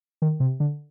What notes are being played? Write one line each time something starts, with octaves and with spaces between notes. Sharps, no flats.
D#3
C3
D3